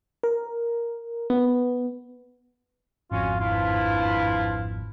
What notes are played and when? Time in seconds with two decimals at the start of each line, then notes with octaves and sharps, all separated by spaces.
0.23 A#4
1.30 B3
3.12 G#1 F2 C#4 F4 F#4
3.40 G2 F3 E4 F4